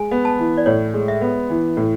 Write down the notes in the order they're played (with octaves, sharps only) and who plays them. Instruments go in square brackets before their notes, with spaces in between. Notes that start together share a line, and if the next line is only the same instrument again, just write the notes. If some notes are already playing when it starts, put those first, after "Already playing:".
Already playing: [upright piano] G#3 [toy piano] G#5
[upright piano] B3
[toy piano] A5
[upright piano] E3
[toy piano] D5
[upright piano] A2 [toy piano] C#5
[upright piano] G#3
[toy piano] E5
[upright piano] B3
E3
A2